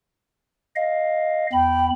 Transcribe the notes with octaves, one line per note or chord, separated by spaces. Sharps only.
D#5 F5
E2 G5 B5